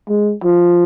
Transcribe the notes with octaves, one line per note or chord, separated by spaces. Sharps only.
G#3
F3